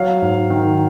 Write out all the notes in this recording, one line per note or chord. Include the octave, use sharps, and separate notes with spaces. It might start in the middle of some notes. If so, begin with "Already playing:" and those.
Already playing: F#3 F5
G#2
D#3